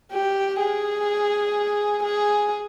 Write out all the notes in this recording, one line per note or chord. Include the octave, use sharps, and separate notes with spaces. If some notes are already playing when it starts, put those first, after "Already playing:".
G4
G#4
G#4